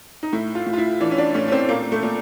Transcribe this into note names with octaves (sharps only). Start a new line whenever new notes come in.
D#4
A2 E4
F4
A2
F4
E4
E3 D4
C#4
D4
A2 C#4
C#4
C4
A#2 A#3
A3
A#2